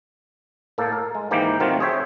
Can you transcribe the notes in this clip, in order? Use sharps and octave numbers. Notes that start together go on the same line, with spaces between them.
A2 A#3 A4
A#4
G#3
G#2 D#3 E3 A#3 G4
C3 D#3 F#3 A3 C4 F4
G#4 C5 C#5 E5 G5